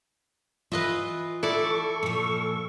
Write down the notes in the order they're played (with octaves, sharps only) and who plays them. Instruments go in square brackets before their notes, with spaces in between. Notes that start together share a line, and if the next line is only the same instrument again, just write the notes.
[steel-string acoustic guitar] E3 F4 [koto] B4 D#5 E5
[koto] E4 D5 [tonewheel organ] A4 C#6
[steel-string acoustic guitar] A#2 F3